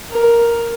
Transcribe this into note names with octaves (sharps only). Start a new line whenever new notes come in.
A#4